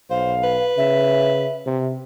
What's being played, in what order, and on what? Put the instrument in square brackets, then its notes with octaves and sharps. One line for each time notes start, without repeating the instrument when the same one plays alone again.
[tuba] B1 [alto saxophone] C5 [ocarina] F5
[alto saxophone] B4
[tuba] C#3 [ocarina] E5
[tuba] C3